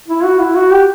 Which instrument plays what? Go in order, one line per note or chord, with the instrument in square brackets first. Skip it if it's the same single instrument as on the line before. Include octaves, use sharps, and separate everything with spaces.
[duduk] E4
F#4
E4
F#4
G4